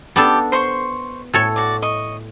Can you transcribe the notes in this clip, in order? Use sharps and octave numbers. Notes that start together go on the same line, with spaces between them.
B3 D4 G4 A4
C5 C6 C#6
A2 A4 C#5
F#4 D5
D#5 C#6